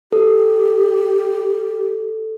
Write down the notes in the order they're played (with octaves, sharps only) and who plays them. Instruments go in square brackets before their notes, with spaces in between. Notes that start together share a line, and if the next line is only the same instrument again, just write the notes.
[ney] G4 [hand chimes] A4